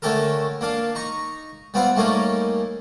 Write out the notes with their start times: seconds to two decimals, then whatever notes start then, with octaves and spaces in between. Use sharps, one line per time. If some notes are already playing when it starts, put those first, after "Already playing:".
0.02 D3 A3 C#4 G4 A4 A#4
0.61 A#3 D4 F5
0.95 D#4 A#5 C#6
1.74 G3 B3 C4 F4 F#5
1.96 G3 A3 A#3 C#4 D#4 A#4